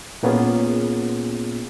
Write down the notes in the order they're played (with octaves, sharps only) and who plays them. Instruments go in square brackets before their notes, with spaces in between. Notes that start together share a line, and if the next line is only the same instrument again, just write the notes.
[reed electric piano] A#2 A#3 B3 C#4 F4 G#4